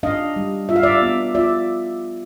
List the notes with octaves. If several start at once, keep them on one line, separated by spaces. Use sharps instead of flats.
D4 D#5 F5
G3
F4 E5
F5
D5 E5
B3
F4 D5 E5